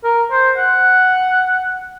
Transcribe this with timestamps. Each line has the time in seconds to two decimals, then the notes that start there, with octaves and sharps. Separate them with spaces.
0.04 A#4
0.31 C5
0.58 F#5